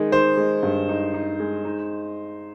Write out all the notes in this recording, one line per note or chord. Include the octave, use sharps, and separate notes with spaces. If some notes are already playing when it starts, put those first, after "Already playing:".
Already playing: D#3 G#3 D#4
D#3 C5
G#3
G2
D#4
D#4
G#3
D#4